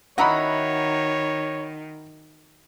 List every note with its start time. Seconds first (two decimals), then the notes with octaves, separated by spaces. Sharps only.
0.18 D#3 E4 F#4 C#5 D#5 F#5 A#5 B5